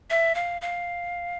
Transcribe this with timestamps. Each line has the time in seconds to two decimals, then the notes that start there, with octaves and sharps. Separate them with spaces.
0.10 E5
0.35 F5
0.62 F5